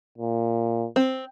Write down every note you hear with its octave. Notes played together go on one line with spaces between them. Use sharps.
A#2
C4